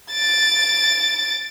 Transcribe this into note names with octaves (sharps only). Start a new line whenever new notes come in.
A6 D7